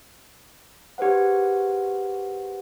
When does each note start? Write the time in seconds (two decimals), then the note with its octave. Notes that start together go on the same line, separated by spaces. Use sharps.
0.98 G4 G#4 B4 C5 F#5